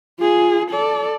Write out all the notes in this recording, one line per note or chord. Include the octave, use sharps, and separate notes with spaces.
F4 G#4
A4 D5